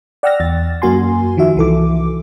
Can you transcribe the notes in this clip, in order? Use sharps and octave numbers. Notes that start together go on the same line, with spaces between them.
D5 F#5 G5 E6 F6 A#6
E2 A6
F#2 A#3 F#4 G#5 C6
D#3 F3 F#4 E5
C2 E3 A4 D6